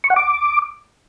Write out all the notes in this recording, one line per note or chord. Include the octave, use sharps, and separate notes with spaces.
C#6
F#5
D6